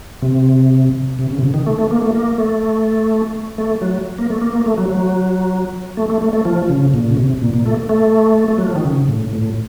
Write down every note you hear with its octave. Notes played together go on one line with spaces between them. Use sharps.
C3
C3
C#3
C3
C#3
D#3
A3
A3
A#3
A3
A#3
A3
A3
F#3
A#3
A3
A#3
A#3
A3
F#3
F#3
A3
A3
A3
A3
F3
C#3
A#2
C#3
C3
A#2
A#2
A3
A3
A3
F#3
F3
D#3
C#3
A2
A2